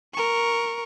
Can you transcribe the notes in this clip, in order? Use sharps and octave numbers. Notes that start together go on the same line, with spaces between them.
A#4 C#6